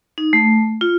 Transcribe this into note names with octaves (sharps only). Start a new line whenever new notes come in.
D#4
A3
F4